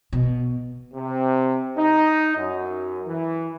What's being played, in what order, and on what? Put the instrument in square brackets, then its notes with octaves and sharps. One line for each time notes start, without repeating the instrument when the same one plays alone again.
[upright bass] B2
[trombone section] C3
D#4
F#2
E3